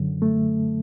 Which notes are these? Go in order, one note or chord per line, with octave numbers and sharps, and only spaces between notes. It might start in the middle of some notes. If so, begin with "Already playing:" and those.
Already playing: F#2 D3 F#3
A3